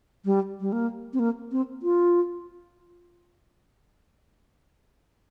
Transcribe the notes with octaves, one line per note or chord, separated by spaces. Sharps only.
G3
G3
A#3
C4
A#3
C4
F4